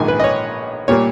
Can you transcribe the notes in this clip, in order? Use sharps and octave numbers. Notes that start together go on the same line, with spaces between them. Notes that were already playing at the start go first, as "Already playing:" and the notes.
Already playing: A#1 G#2 D#3 A#3 G#5
B4
D#5
C#5
A#2 G3 A#3 C#5